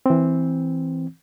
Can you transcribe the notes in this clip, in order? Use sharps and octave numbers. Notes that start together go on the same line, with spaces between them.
E3 C4